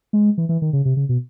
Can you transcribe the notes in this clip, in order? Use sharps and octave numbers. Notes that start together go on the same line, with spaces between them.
G#3
E3
E3
D#3
C#3
C3
C#3
B2